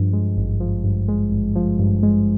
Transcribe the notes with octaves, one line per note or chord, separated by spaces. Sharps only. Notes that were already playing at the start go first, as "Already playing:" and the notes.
Already playing: G2 F3
G#3
G#1
F3
G2
G#3
G#1
F3
G2
G#3